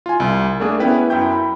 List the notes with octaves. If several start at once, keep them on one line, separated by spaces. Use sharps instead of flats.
F4 G#5
C2
A3 A#3 D4 G#4
B3 C#4 E4 B4 G5
F#2 E4 G5 G6
B5